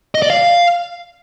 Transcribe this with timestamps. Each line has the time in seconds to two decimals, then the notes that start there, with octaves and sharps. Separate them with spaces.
0.15 D#5
0.22 D5
0.30 F5